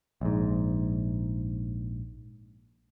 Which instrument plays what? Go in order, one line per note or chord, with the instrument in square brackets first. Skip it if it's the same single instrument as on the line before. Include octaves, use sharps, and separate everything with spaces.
[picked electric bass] A#1 G#2